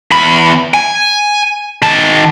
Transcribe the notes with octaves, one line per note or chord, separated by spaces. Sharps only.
E2 B5
G#5
D#3 A5